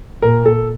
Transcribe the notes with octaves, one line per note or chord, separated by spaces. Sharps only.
A#2 A#4
A4